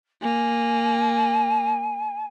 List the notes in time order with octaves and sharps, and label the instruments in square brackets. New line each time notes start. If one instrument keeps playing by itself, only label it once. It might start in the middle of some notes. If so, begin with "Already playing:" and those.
[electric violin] A#3 [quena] G#5